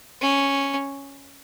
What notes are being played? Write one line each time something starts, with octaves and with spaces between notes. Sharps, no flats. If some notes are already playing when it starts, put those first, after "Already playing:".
C#4